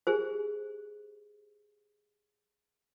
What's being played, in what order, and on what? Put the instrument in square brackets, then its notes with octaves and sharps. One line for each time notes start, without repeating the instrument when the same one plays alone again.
[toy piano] G4 G#4 C5